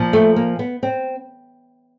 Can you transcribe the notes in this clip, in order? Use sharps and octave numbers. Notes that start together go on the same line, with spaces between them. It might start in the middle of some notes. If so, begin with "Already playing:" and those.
Already playing: A#2 F3
A3
A#3
B3
C4